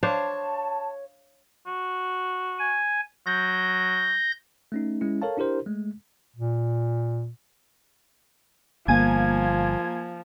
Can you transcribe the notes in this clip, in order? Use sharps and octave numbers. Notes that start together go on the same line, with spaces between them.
D4 C5 C#5 F5 A5
F#4
G#5
F#3 G6 A#6
A3 C#4 D#4
G#3 C#4 E4
A4 A#4 C#5 F5 A5
D4 E4 G4 A#4 C5
G#3 A3
A#2
G1 F3 A#3 G#5 G#6